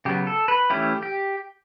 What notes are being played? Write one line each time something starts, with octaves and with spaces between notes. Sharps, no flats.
C#3 F#3 B3 G4
A4
B4
E3 A3 C#4 E4 G4
G4